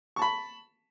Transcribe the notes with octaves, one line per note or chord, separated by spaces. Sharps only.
A5 B5 C#6